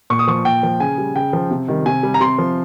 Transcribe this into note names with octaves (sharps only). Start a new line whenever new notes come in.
A#2 C#6
D#6
F3 C#6
A#2 G5
F3
C#3 G#5
G3
C#3 G5
F3
C3
D#3 G3
C3 G#5
G3
A#5
C3 C6
F3